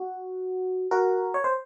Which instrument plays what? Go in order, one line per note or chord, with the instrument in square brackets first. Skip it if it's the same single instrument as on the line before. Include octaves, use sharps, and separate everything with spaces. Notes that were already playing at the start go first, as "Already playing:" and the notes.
Already playing: [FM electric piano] F#4
F#4 A#4
C#5
C5